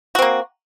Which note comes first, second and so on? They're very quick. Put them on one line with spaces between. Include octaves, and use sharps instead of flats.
F#4 C4 A#3